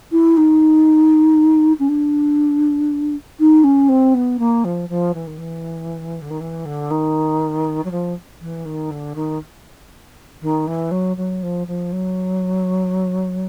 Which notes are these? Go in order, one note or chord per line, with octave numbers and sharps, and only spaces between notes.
E4
D#4
C#4
D4
D#4
C#4
C4
B3
A#3
F3
F3
E3
D#3
E3
D3
D#3
E3
D3
D#3
F#3
F3
E3
D#3
D3
D#3
D#3
E3
F#3
F#3
F3
F3
F#3